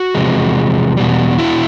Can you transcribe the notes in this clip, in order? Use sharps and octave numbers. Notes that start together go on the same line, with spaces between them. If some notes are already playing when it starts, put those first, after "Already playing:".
Already playing: F#4
E2 C3 F3 G#3
E2 B2 G3
E4 F#4